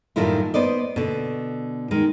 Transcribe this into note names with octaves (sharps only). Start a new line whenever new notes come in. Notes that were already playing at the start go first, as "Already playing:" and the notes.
F#2 A2 D#3 G3 E4 F4
B3 C5 D5 D#5
B2 D3
D#3 G#3